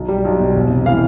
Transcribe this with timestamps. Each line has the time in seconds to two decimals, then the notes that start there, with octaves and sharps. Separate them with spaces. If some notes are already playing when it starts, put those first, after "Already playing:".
Already playing: B1
0.08 G3
0.25 B1
0.39 B2
0.54 E1
0.70 C3
0.86 E3 F5